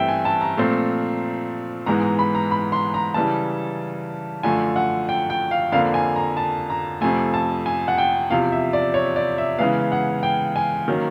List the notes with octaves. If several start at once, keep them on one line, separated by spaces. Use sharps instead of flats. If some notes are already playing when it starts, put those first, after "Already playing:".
Already playing: G2 E3 A3 C4 E5 G5
G#5
A5
A#5
A#2 F3 A3 C4
G#2 E3 G#3 B3 A#5
A#5
B5
A#5
B5
C6
A#5
C#3 E3 G3 A5
F#2 D3 F3 A3 G#5
F#5
G5
G5
F5
F2 D3 F3 A#3 F5
G#5
A#5
A5
A#5
F2 C3 F3 A3 G#5
A5
G#5
F#5
G5
E2 C3 F3 F5
E5
D5
C#5
D5
E5
C#3 E3 G#3 B3 F5
F#5
G5
G#5
D#3 F#3 A#3 C#4